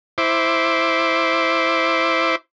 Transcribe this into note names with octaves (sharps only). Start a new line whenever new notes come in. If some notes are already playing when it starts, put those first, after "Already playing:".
E4 C5 D6